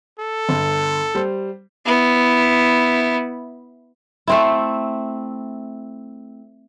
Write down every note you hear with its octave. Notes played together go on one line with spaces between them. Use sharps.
A4
G1
G3 C5
B3 E4
A3 C4 E4